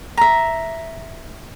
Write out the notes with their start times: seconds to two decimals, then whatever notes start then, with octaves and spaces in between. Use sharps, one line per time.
0.17 E5 A#5